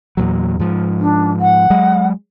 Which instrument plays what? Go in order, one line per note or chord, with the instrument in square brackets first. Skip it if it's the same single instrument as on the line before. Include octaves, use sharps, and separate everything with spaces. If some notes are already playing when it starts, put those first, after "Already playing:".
[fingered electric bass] E2 A#2 F#3
G#2 F3
[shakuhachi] D4
F#5
[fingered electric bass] F#3 G#3